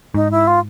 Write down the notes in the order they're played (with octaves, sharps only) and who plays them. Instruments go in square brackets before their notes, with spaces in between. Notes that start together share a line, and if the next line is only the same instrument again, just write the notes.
[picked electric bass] G#2 [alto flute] D#4
[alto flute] E4
F4